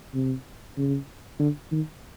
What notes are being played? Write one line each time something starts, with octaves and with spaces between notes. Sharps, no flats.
C3
C#3
D3
D#3